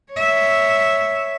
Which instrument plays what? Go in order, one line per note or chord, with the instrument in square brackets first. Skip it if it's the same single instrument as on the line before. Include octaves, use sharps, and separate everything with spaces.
[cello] C#5 E5